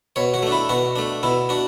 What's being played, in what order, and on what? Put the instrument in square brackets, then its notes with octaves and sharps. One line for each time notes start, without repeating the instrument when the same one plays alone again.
[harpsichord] B2 C#5
F#4
A3 D4
E4
B2 F#4
A3 D4
B2 E4
D4 F#4